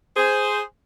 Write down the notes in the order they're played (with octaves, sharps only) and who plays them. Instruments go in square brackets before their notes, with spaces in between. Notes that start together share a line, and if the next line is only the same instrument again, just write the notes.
[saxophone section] G#4 C5